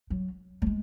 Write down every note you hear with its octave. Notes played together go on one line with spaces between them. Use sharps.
F#3
A3
G#3